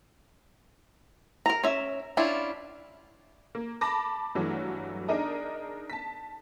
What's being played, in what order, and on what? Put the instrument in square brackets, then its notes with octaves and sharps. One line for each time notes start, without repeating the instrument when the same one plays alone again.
[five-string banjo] A#4 A#5
C#4 E5
C#4 D4 E4 F4
[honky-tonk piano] A#3
A5 B5 D6 A#6
G2 E3 F#3 A3
D4 D#4 G#4 A#4 D#5 A#5
A5 B6